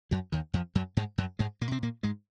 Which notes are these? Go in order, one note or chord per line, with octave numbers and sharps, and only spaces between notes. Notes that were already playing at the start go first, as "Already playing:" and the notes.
F#2 F#3
D#2 D#3
F2 F3
F#2 F#3
G#2 G#3
F#2 F#3
G#2 G#3
A#2 A#3
C3 C4
A#2 A#3
G#2 G#3